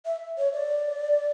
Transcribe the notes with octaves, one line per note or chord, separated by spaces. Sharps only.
E5
C#5
D5